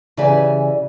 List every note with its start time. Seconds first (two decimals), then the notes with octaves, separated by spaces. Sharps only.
0.17 C#3 E3 G4 D5 E5 G#5